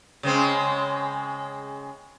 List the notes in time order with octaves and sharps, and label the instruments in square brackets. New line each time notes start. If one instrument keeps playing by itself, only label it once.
[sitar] C#3 G#3 C4